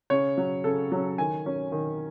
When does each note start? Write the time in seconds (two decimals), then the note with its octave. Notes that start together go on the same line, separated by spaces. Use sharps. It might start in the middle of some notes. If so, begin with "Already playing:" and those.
0.10 C#3 C#5
0.37 F#3 C#4
0.64 C#3 A4
0.92 F#3 C#4
1.18 D#3 G#5
1.46 F#3 C#4
1.72 D#3